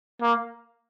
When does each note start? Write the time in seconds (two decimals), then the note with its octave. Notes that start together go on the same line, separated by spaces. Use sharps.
0.21 A#3